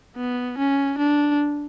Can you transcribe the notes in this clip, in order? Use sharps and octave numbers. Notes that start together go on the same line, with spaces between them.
B3
C#4
D4